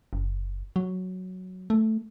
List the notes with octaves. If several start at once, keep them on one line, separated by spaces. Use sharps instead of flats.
F#1
F#3
A3